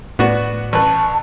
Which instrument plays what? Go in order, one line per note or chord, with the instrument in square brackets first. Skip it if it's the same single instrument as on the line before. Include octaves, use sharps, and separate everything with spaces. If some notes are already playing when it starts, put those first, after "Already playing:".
[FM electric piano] A2 [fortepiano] B3 D4 F#4
[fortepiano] A1 B4 [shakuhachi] A5